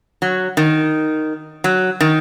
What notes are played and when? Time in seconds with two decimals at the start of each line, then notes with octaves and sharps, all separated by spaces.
0.22 F#3
0.57 D#3
1.64 F#3
2.00 D#3